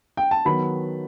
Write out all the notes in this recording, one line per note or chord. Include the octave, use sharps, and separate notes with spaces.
G5
A5
D#3 F#3 B3 B5